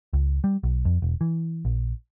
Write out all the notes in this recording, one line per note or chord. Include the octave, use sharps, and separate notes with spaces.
C#2
G3
B1
F2
E1
E3
A#1